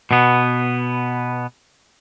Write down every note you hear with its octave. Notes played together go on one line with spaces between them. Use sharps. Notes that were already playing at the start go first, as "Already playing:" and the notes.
B2 B3